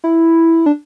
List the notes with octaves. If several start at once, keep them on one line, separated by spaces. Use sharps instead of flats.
E4
D4